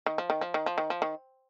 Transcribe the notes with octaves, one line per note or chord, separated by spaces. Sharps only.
D#3
F3
D#3
F3
D#3
F3
D#3
F3
D#3